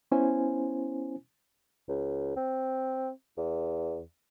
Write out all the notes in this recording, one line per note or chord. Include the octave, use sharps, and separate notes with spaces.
B3 C#4 E4 C5 G#5
C#2
C4
E2